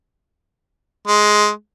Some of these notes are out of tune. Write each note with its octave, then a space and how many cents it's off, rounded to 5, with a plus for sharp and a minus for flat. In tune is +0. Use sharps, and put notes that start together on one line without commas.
G#3 +10